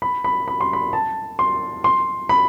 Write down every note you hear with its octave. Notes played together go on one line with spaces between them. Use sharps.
B5
B5
B5
C6
B5
A5
C6
C6
B5